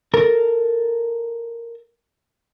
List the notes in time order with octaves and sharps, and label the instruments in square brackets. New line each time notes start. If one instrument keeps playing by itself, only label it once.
[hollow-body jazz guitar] A4 A#4